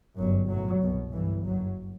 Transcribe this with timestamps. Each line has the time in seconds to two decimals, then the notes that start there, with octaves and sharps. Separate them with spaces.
0.16 G1 F#2 F#3
0.49 B1 A2 F#3
0.81 C2 B2
1.13 G1 G2 E3
1.46 F#1 F#2 F#3